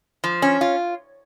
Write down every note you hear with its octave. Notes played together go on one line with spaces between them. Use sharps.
F3
C#4
F4